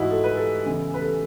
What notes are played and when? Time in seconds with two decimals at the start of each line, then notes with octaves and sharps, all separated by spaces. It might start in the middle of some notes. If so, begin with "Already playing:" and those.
Already playing: G#2 E3 D#4 E4 F#4
0.11 A4
0.24 B4
0.37 A4
0.65 E2 C#3 E3
0.94 B4
1.01 A4